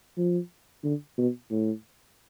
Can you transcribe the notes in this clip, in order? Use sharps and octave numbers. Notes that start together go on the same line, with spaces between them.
F3
D3
B2
A2